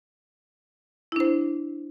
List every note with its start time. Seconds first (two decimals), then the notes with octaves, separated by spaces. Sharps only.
1.12 E4
1.16 D4
1.20 C5